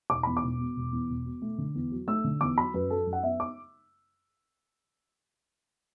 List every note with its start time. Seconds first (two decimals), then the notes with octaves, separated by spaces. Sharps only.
0.10 E1 D6
0.23 E2 B5
0.37 D6
0.43 E1
0.59 B2
0.76 E1
0.92 E2
1.09 E1
1.25 B2
1.42 A3
1.58 D3
1.75 E2
1.92 F#3
2.08 A3 E6
2.24 D3
2.41 E2 D6
2.57 F#3 B5
2.74 F#2 B4
2.90 F#3 A4
3.07 F#2
3.13 F#5
3.23 B3 E5
3.40 D6